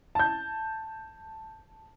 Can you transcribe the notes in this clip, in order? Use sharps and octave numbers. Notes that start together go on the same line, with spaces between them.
A5 G6